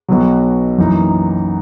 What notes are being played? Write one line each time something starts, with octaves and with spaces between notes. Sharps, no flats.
B1 B2 F#3
F#2 E3 A#3 D#4